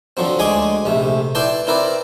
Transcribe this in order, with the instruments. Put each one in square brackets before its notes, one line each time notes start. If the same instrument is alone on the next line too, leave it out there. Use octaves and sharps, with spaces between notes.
[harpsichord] D3 F3 F#3 C4
D2 G#3 G#4 G#5 C6 D6
A#1 C3 A3
E4 B4 D5 G5 A5 C6
C4 E4 A#4 B4 D5